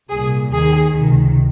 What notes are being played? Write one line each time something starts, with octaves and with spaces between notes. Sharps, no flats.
C2 A#2 G#4
D#2 D#3 G#4
C#2 C3 D#3